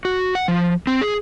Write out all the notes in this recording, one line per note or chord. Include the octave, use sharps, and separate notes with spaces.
F#4
F#5
F3
C4
G#4